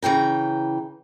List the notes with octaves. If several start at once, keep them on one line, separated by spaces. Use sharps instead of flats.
C#3 E3 G5 A#5